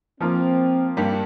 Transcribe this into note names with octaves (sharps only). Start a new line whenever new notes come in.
F3 A#3 C4 F4 A#4
G2 G3 A#3 G4